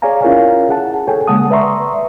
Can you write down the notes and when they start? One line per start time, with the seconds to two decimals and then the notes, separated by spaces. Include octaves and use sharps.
0.02 G#4 C#5 D5 F5 G#5 A#5
0.22 C#4 E4 F4 A#4 C#5 F5
0.69 G#4 F#5 A5
1.07 G#4 A4 C#5 G5 G#5
1.27 C#3 G#3 A#3 F#5 A5 D#6
1.50 B4 D5 E5 A#5 C6 C#6